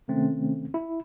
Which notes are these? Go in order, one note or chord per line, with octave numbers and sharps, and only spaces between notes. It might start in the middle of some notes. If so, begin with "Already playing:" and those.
C3 D#3 A3 C4 C#4
E4